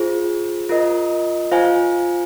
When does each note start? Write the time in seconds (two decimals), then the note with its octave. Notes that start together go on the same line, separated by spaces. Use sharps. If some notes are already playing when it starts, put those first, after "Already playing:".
Already playing: F4 G#4 C5
0.69 F4 A#4 D#5
1.51 F4 C5 F5 G#5